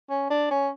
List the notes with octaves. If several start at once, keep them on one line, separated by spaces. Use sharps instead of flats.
C#4
D4
C#4